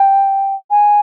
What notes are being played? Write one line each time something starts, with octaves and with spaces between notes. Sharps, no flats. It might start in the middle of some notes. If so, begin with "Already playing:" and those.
Already playing: G5
G#5